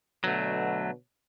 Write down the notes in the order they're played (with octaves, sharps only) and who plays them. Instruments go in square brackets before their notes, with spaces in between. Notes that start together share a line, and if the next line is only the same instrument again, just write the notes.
[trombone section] B2 D3 [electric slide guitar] F#3 A3